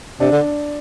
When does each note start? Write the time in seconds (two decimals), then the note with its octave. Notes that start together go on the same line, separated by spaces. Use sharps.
0.20 C3 D4
0.32 D3